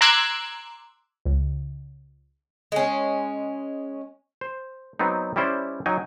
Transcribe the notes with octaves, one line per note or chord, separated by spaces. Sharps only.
A#5 C6 D6 E6 F#6 G#6
C#2
G#3 C#4
C5
F#3 B3 C4 D#4
G3 C#4 E4 C5 D5
F#3 D#4 G5 G#5